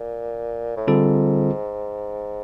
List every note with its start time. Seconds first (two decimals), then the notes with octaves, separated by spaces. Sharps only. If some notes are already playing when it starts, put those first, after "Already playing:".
Already playing: A#2
0.76 A2
0.87 G#2 D3 G3 C4 F4 A4